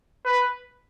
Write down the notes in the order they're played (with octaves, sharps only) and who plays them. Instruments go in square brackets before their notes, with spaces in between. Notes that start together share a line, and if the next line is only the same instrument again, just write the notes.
[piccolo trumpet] B4